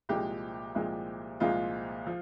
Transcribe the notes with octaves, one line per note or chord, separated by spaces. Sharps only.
C2 A#2 F3 G#3 G4
C2 A#2 F3 G#3
C2 A#2 F3 G#3 F4
F3